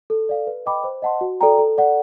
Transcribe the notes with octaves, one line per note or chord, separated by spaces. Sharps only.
A4
D5 F5
B4
D#5 G5 B5 D6
C5
D#5 F#5 A5 C6
F#4
A4 D5 G5 A#5
A4
D5 F#5